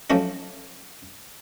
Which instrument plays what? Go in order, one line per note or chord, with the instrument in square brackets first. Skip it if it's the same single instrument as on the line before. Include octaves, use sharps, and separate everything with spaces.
[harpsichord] F3 F#3 A3 C#4 D#4